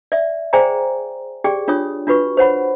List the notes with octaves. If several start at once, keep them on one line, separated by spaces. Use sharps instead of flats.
D5 E5
G#4 C5 D5 G5 G#5 A#5
G4 G#4 D5 G5
D4 F4 C#5 D#6
D4 F4 F#4 B4 C#6
C5 C#5 F#5 B5